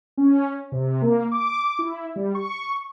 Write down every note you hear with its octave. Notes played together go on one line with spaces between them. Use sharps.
C#4
C3
A#3
D6
E4
G3
C#6